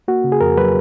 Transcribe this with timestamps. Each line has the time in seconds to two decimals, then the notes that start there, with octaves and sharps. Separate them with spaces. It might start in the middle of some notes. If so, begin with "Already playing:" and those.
0.08 A#3 F#4
0.24 C#3
0.32 G#4
0.41 F2 A#4
0.57 F#3 B4